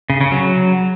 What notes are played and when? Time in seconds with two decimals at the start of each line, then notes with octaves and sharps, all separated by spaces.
0.10 C#3
0.21 C#3
0.32 F#3